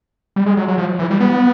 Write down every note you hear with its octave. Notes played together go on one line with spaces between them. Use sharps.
G3
G#3
F#3
F#3
F3
E3
G3
B3